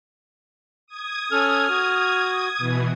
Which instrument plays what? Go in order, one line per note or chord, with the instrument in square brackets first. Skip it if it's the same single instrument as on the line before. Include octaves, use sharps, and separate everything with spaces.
[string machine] D#6 G#6
[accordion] C#4 A4 [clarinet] F6
[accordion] F#4
[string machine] B2 E3